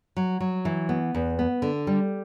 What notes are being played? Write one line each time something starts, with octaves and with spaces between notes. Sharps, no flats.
F#3
F#3
E3
B3
E2
B3
D3
G3